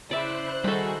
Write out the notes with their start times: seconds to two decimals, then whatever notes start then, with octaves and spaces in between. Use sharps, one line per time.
0.11 C#3 E4 C5 D5 E5 F#6
0.64 D#3 G3 F#4 G#4 A4 B5